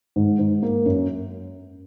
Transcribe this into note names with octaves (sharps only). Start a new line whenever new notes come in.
G#2
G#2
A#3
F#2